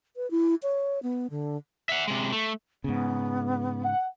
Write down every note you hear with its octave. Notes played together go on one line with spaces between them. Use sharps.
B4
E4
C#5
B3
D3
E5 F#5
C3 G#3
A3
G#2 C#3 B3
F#5